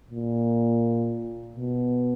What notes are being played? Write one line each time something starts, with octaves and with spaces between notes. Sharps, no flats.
A#2
B2